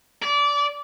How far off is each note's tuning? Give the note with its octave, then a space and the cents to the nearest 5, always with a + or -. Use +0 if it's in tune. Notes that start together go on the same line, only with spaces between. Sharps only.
D5 -25